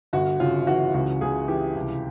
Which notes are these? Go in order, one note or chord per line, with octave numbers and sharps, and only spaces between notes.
G1 F#4
C#3 F4
E3 F#4
C#2 F#4
C#2 G#4
E3 G4
C2